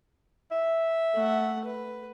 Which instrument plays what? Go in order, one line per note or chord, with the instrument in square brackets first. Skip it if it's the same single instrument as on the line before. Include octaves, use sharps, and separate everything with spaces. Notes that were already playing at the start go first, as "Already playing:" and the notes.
[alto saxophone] E5
[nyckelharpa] A3 F#5
B4